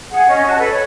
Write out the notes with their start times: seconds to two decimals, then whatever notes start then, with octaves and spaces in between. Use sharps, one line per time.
0.10 G#4 F#5
0.28 C#4 D#5
0.46 F#4 A5
0.58 A4 B4
0.72 C#5